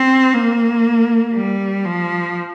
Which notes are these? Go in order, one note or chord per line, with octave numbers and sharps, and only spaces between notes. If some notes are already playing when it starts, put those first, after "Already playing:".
Already playing: C4
A#3
G3
F3